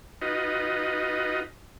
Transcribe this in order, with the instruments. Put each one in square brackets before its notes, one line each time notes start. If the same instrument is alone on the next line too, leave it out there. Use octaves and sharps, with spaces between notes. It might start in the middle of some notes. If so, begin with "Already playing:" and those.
[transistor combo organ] D#4 F4 F#4 B4 D#5